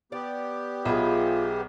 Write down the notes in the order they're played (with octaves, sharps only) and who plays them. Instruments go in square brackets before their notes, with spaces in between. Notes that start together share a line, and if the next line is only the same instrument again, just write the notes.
[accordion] B3 G4 [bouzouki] D5
[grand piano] B1 [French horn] F4 [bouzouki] G#4 B4 E5